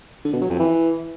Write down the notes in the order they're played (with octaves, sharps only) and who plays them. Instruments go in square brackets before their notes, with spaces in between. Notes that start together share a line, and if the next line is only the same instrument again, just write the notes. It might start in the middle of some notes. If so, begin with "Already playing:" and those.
[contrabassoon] D3
B2
F#3
F2
E3